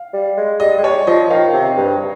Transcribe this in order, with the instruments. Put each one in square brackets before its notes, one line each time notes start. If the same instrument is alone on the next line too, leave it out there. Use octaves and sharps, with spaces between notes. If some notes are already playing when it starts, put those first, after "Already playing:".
Already playing: [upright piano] F5
[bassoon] G3
G#3
[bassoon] G3 [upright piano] D#5
[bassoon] G#3
[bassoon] G3 [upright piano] C#5
[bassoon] F3 [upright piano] D#5
[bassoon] D#3 [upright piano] F5
[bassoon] C3
G2